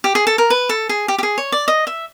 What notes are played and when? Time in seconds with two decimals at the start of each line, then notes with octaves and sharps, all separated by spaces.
0.04 G4
0.15 G#4
0.27 A4
0.38 A#4
0.50 B4
0.69 A4
0.89 G#4
1.08 G4
1.18 G4
1.23 G#4
1.38 C#5
1.52 D5
1.68 D#5
1.87 E5